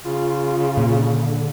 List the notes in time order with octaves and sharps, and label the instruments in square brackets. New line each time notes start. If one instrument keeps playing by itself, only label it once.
[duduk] C#3 [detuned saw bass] F4
[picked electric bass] A#2
[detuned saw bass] D3